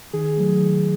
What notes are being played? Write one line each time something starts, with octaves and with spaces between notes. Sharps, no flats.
D#3 G#4
F#3 A3
D#3